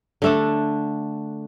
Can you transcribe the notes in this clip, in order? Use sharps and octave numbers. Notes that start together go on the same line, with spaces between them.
D3 A3 D4